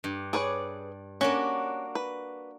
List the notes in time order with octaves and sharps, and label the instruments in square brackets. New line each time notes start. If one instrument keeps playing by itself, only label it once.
[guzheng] G2
[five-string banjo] G#4 B4 C#5 [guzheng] D5
[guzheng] A#3 D4 F#4 [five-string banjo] C#4
[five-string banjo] B4